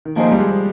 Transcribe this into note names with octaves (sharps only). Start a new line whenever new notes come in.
D#3
F3 A#3 D#4 G#4 C5
G3
G#3